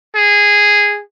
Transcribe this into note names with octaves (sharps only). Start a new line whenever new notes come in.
G#4